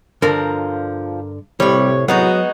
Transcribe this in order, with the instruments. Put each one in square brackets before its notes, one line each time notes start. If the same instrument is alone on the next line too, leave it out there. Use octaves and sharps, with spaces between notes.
[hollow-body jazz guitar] G2 D3 [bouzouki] F3 [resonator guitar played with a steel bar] A#4
[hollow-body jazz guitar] C2 A2 [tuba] C3 [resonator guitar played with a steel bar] G3 [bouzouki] C#5
[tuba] F#3 [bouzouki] G#3 D#4 F#4 [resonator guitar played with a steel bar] B3